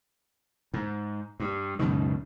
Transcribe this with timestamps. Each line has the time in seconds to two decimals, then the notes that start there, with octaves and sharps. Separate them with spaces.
0.74 G#2
1.40 G2
1.79 C#2 F#2 B2 D#3